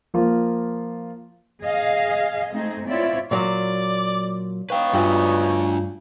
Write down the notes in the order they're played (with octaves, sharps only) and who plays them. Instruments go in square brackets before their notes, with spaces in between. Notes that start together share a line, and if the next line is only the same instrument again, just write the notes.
[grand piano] F3 A#3 F4
[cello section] G#4 D#5 F5
A3 C4 D#4 G#4
C4 E4 F4 C#5 D5 E5
[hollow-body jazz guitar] A#2 F#3 [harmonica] D5
[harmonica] B3 D#4 C#5 [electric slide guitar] B4 G5 [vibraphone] F5
[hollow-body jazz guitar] G2 [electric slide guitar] D4 F#4 [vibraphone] F4 G#5